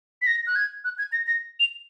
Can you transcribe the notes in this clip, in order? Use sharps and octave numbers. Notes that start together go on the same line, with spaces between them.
B6
A#6
F#6
G#6
F#6
G#6
A#6
A#6
F7